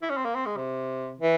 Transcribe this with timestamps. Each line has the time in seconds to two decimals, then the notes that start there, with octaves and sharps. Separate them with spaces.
0.02 E4
0.10 C#4
0.17 C4
0.25 A#3
0.35 C4
0.46 G#3
0.57 C3
1.20 E3